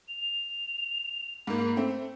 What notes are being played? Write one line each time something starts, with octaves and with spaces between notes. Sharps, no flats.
F7
G#2 A#3 B5
A3 C4